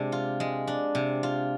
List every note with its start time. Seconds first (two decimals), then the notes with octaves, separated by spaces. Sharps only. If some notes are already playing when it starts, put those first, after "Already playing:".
Already playing: C3 G#3 D4
0.12 F4
0.40 G#3
0.67 D4
0.95 C3
1.23 F4